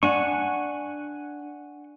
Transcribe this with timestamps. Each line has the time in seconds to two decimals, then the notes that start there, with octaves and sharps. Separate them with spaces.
0.03 D4 F#5 G#5 C#6